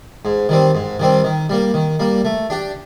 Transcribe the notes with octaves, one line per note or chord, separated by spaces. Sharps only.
G#2
D#3 G3 C4
G#2
D#3 G3 C4
D#3
G3 A#3
D#3
G3 A#3
A3
D4 G4